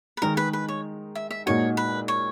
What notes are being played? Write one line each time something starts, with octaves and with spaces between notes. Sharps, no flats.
B4
D#3 G#3 D#4 A#4
B4
B4
C#5
E5
E5
A#2 G#3 D#4 F#4 C#5
B4
C#5